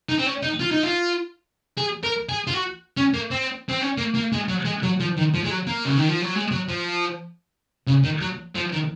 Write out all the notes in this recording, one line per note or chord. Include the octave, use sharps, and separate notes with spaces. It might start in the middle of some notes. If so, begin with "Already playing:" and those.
D#4
C4
C#4
D#4
F4
D#4
F4
G#4
A#4
G#4
F4
F#4
C#4
A#3
C4
C4
C#4
A#3
A#3
G#3
F#3
G#3
F#3
F3
D#3
F3
G#3
F#3
A#3
C#3
D#3
F3
F#3
G#3
F#3
F3
C#3
D#3
F#3
F3
D#3